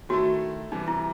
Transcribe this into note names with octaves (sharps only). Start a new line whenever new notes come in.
D#3 A3 E4 F#4 A4
C3 E3 G3 D#4
E4